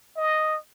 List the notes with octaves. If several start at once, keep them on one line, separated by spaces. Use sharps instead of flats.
D#5